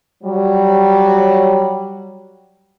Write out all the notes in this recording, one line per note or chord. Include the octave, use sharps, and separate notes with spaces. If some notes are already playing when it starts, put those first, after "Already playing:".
F#3 G3